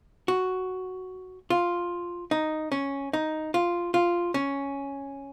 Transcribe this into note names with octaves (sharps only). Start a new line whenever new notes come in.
F#4
F4
D#4
C#4
D#4
F4
F4
C#4